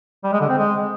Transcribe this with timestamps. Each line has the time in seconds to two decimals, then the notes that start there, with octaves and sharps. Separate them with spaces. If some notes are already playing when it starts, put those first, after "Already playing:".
0.24 G3
0.32 G#3
0.41 D3
0.49 C4
0.57 G#3